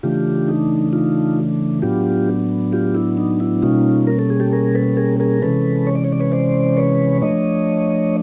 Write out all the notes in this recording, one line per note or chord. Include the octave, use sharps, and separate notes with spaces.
C#3 E3 A3 D4 F4 G4
D#4
D#4 F4
A2 F#3 B3 D4 F4 G4
F4 G4
E4
D#4
E4
B2 G3 A#3 C#4 D#4 F4
A#4
A4
G#4
G4 A4
G#4 A#4
A4 B4
G#4 A#4
G#4 A#4
C3 E3 G#3 C#4 A4 B4
C#5
D5
C#5
D5
B4 C#5
C5 D5
B4 C#5
F3 A3 D4 C#5 D#5